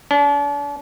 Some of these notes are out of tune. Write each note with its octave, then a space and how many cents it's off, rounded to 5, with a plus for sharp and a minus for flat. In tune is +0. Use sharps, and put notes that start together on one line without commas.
D4 -40